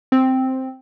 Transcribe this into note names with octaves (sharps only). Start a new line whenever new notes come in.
C4